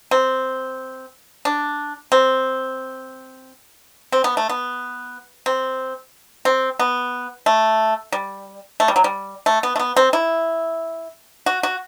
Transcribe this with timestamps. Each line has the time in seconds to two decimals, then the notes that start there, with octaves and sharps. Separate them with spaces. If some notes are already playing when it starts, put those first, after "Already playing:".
0.11 C4
1.45 D4
2.12 C4
4.12 C4
4.24 B3
4.37 A3
4.49 B3
5.46 C4
6.45 C4
6.79 B3
7.46 A3
8.12 G3
8.80 A3
8.88 G3
8.96 F#3
9.04 G3
9.46 A3
9.63 B3
9.76 A3
9.80 B3
9.96 C4
10.13 E4
11.46 F#4
11.63 F#4